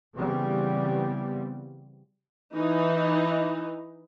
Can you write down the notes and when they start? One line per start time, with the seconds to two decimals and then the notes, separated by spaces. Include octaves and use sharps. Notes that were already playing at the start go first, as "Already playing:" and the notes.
0.16 C#3 E3 G3 B3 C4
2.54 E3 D#4